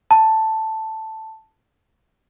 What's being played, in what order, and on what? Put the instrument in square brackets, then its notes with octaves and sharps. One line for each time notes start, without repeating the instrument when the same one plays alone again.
[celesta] A5